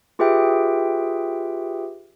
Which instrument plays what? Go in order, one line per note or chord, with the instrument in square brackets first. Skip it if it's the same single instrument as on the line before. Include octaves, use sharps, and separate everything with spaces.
[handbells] F4 G4 G#4 B4 E5 G5